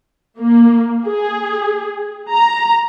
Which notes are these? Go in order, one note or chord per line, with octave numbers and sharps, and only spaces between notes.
A#3
G#4
A#5